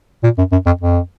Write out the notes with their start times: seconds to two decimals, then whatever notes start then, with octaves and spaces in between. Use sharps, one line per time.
0.24 A#2
0.38 F#2
0.52 F#2
0.66 F2
0.81 F2